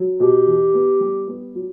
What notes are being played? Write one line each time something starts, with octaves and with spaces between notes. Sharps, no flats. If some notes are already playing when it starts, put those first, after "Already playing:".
Already playing: F#3
B2 G4
E2
B3
G3
B3
F#3